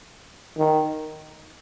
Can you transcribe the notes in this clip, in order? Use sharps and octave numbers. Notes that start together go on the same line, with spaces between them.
D#3